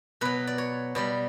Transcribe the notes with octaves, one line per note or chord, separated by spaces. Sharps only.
B2 F#3 B4
D5
C#5
B2 G3 D5